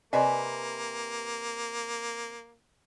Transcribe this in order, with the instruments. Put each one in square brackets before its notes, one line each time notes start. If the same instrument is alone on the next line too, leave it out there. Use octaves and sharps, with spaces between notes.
[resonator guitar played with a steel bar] C3 B4 G#5 [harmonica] A#3 [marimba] D5 D#5